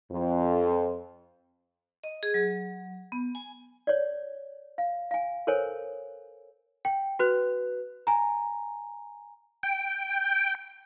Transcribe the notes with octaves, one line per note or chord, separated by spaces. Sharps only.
F2
D#5
G#4
F#3
B3
G#5
C#5 D5
F5
F5 G#5
A4 A#4 C5 C#5 G#5
G5
F#4 B4 F#6
G#5 A#5
G5